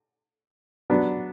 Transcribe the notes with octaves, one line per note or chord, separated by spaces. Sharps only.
F#3 B3 D4